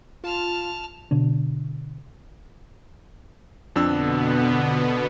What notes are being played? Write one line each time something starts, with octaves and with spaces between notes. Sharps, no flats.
F4 A5 F6
B2 D3 D4
F2 B2 D3 B3 D4 E6